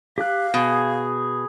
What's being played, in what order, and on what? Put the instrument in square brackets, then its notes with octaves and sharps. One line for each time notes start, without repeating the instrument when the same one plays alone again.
[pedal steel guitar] G4 F#6 [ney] F5
[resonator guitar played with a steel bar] B2 [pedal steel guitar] G#4